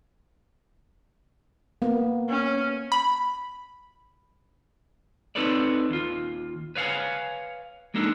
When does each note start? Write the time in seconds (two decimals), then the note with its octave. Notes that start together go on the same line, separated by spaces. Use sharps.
1.82 A#3 B3
2.29 C#4
2.92 B5
5.35 C4 D#4 A4 B4 C#5 D5
5.90 D#2 F4
6.75 B4 C#5 F5 F#5 G#5
7.94 G#3 A#3 D4 D#4 A4